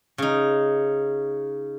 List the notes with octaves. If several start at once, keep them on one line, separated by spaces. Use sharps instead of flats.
C#3 D#4